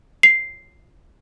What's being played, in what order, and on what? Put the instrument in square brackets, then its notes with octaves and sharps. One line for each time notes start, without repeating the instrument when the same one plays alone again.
[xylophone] C7